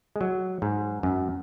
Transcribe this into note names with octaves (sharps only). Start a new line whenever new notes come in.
G#3
F#3
G#2
F#2